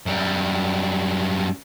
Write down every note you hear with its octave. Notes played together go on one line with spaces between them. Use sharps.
F#2 G3